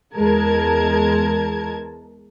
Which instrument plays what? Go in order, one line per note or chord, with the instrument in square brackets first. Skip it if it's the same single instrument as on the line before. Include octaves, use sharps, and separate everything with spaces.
[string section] E2 G#3 A#4 A5 G#6